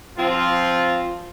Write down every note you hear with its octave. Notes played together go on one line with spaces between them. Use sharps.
F3 C4 F4